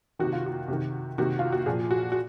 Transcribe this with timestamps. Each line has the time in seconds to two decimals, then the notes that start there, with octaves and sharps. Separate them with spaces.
0.19 C3 D#3 F#4
0.33 F4
0.46 F#4
0.68 C3 D#3
1.18 C3 D#3 F#4
1.39 F4
1.52 F#4
1.66 A#2 F3 G#4
1.91 F#4
2.12 F#4